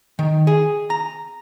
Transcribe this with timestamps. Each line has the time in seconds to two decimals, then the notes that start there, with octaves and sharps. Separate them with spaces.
0.19 D#3
0.47 G#4
0.90 A#5